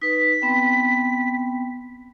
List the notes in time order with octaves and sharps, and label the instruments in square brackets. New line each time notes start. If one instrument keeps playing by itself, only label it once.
[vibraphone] D#4 B4 [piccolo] B6
[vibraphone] B3 C4 G5